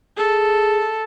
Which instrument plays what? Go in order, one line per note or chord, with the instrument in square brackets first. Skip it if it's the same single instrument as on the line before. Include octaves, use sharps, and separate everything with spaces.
[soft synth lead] G#4 [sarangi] A4